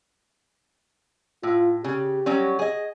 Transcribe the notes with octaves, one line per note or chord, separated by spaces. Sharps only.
A2 F4
C#3 G4
F#3 G3 C#4
G#4 D#5